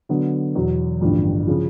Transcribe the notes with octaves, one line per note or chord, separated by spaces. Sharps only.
D3 F#3 B3
E2 B2 F#3
A1 G2 D3 F3
C#3 F3